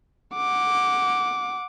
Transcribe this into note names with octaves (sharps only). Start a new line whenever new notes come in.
F#5 D6